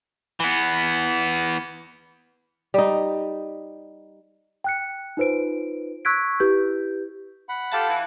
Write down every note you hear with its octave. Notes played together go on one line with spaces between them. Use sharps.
E3 B3
G3 D#4
G5 F#6 C#7
D#4 F4 B4 C5 D7
C#6 E6 F#6 G#6 B6 D7
E4 G4 B4 G6
F#5 B5
F4 G4 A4 F5 A5
E3